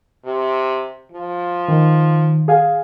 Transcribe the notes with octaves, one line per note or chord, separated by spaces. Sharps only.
C3
F3
D#3
G#4 F5 G#5